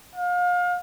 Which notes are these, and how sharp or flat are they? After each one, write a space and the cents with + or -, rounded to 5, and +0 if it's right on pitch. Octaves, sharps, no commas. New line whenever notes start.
F5 +35